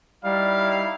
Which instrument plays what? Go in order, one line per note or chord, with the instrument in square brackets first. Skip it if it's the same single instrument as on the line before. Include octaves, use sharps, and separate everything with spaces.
[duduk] G3 [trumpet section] D#4 E4 F5